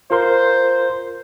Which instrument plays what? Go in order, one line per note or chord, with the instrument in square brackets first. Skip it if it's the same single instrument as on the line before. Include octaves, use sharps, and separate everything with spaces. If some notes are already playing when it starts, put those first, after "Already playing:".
[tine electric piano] F4 A#4 C6 [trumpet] C5